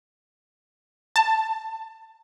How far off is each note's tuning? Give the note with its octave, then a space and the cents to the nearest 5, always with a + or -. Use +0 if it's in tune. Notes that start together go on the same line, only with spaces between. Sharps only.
A5 +20